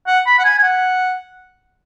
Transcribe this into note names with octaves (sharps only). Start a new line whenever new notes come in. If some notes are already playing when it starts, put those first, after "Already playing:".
F#5
B5
F#5
G#5
G#5
F#5